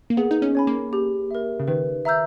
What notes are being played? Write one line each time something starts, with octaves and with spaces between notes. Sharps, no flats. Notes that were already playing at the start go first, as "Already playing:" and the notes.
A#3
B3 G#4
D#4
C#4
C#5 G#5 B5
A#3
G4
A#4 E5
C#3
D#3 B4
E5 A#5 E6 G6